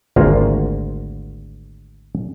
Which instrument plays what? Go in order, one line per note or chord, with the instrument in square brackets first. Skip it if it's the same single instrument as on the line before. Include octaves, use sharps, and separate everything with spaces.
[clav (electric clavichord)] G#1 D2 A#3 F4